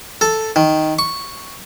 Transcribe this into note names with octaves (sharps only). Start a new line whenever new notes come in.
A4
D#3
C#6